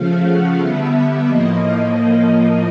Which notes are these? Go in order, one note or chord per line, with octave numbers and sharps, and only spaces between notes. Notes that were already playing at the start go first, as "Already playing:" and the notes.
Already playing: C#3 F3 A3 F5
F#5
D3 G3 B3 E5
A2 F3 A#3 D#5